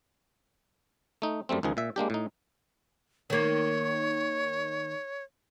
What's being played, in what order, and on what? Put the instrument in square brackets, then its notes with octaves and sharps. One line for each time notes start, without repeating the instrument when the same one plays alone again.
[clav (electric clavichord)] A3 D#4
F#2 G3 A3 C4
C#2 D#3 F3 G#4
A#2 E5
G#3 A#3 D4 G4
A2 D#4
[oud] D#3 A#3 [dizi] C#5